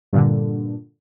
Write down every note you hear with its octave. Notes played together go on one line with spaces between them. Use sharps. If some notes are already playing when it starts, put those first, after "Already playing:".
G2 A#2 D3